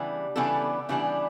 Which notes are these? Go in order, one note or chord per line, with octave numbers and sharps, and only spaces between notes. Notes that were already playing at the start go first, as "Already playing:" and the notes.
Already playing: C#3 E3 G3 B3 D4
C#3 E3 G3 B3 D4 A4
C#3 E3 G3 B3 D4